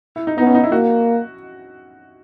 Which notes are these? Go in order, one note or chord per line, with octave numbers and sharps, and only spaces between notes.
E4
D#4
B3 D#4
C#4
D#4
E4
A#3 F#4